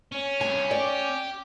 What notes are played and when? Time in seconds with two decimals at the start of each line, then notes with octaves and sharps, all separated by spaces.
0.12 C#4
0.41 G2 C3 G#5
0.71 G4 D5